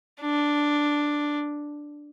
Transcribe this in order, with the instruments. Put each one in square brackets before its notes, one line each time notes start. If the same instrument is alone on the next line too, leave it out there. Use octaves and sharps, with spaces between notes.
[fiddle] D4